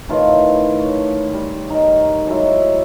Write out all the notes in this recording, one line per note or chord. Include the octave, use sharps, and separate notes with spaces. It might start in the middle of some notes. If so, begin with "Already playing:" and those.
A2 D#3 F4 B4
C#5
G3
D#4 A#4
F#3 G#3 E4